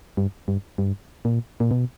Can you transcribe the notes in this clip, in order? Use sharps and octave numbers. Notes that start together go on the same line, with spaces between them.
G2
G2
G2
A#2
A#2
B2